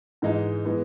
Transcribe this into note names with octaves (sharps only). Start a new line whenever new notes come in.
G#2 E3 G#3 D#4
E3 G#3 B3